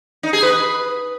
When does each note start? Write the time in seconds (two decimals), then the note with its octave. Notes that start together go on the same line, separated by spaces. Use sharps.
0.23 D#4
0.33 G#4
0.43 B4